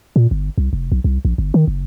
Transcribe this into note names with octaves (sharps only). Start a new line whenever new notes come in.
A#2
G1
C2
F1
B1
C2
A#1
G1
D#3
F#1